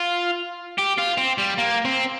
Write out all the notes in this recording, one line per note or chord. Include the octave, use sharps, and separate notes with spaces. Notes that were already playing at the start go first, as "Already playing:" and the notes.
Already playing: F4
G4
F4
C4
G3
A#3
C4